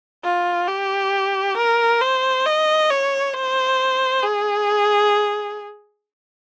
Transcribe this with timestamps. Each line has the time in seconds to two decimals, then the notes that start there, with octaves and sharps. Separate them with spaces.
0.24 F4
0.68 G4
1.57 A#4
2.01 C5
2.46 D#5
2.91 C#5
3.34 C5
4.23 G#4